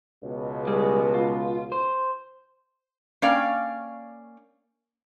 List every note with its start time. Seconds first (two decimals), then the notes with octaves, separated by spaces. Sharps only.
0.23 C#2 B2
0.67 G3 G#3 G#4
1.14 F4
1.72 C5
3.22 A#3 C#4 D5 F5 G5